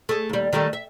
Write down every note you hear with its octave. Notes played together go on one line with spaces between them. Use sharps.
A3 G#4
D#2 G3
D#3 G3 A3
E5